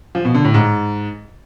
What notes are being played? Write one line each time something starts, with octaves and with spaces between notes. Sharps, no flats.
F3
B2
D3
A2
G#2